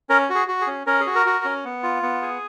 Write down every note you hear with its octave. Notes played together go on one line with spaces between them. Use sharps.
C#4 A#4
F#4
G#4
F#4
G#4
C#4
C#4 A#4
G#4
F#4
A#4
F#4
C#4
B3
F4
B3
G#4